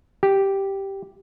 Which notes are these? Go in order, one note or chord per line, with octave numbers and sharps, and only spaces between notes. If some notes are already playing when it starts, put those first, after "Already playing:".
G4